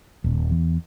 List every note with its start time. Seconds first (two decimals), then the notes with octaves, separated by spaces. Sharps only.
0.24 D#1
0.51 E2